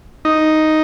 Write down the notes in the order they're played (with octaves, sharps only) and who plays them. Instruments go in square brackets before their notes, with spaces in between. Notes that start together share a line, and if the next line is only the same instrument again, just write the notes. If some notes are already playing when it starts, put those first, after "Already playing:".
[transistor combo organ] D#4